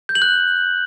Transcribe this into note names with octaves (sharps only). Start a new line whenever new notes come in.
G6
F#7
F#6